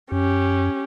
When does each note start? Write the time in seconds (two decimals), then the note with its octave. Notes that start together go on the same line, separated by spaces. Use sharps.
0.12 F#2 C#4 G4